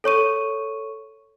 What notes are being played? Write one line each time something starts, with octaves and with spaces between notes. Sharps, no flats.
A4 C#5 C#6 D#7